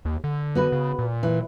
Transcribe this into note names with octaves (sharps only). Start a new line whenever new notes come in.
D#2
D3
B3 F#4 B4
C#3
A#2
E3